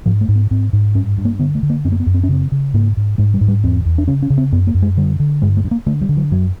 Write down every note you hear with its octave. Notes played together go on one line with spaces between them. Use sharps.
G#2 F3
A3
G#2
B3
G#2 C4
G#2
G2 C#4
G2
A#3
D3 B3
A3
D3
A#3
F#2 C4
A#3
B3
F#2
C4
C#4
C#3 C4
C#3
G#2 A#3
G#2
G#2 G#3
G3
G#2
G3
E2 C4
E2
D4
C#3 C#4
C#4
C#3
C4
F#2 B3
A#3
F#2
G#3
D3 G3
D3
G2 G#3
A3
G2
A#3
D3 A3
G3
D3
F#3
F#2 F#3